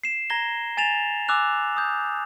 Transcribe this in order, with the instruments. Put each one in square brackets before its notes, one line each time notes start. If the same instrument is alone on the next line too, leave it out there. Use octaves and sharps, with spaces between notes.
[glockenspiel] C7 E7
A#5 G#6 A#6 G7
G#5 A6 E7 F7
G#5 D6 E6 F#6 F7
D#6 G6